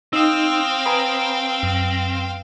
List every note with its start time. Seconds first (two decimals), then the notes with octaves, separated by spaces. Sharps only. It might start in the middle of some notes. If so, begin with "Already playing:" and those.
0.13 C4 D#4 F5 G5 D#6 E6
0.86 B4 G#5 A#5 B5 D#6
1.63 F#2